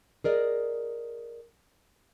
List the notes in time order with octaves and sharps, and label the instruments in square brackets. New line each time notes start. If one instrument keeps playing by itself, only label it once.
[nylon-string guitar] G#4 A#4 D5 D#5